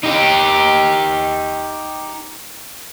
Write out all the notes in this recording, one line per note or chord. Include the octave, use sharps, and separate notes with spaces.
D#4 G4